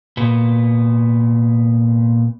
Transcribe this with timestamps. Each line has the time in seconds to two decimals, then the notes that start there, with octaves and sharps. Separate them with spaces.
0.17 A#2 B3